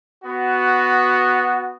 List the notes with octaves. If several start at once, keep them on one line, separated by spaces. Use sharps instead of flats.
B3 F#4